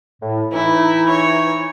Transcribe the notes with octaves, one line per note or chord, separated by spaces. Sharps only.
A2
E3 D#4 E4
C#5